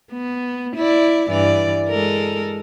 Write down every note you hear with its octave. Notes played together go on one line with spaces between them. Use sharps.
B3
E4 D5
G2 E3 D5
G#3 A4 A#4